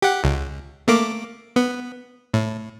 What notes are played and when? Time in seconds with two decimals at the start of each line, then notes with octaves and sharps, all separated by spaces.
0.02 G4 F#5
0.24 C#2
0.88 A3 A#3 D6
1.56 B3
2.34 A2